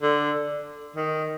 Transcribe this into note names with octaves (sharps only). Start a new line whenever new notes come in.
D3
D#3